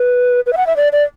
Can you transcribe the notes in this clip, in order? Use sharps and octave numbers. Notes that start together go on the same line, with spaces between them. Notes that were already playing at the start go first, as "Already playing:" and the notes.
Already playing: B4
B4
E5
F#5
E5
D5
D5